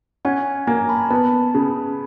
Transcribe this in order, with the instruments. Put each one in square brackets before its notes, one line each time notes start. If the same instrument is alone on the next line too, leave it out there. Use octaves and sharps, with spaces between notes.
[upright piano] C#4 [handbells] F#5 G#5
[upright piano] A#3 [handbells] G#5 A#5
[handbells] A5 B5
[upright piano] B3 [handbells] A5 B5
[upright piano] C#3